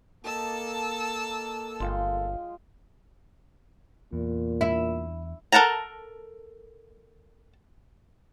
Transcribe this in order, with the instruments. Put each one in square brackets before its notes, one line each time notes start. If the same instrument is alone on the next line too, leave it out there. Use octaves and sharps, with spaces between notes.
[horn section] A#3 A4 [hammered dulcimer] G4 D#5 [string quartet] A5 E6
[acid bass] G1 [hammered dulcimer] G#3 F4 G5
[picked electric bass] E2 [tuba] A#2
[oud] E4 [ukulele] E5
[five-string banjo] A4 A#4 F#5 A5 A#5